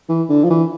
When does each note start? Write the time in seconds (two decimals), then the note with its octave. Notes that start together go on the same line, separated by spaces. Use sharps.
0.09 E3
0.29 D3
0.44 F3
0.50 E3